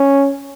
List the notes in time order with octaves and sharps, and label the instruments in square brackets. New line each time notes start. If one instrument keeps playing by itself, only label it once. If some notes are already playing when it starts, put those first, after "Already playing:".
Already playing: [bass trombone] C#4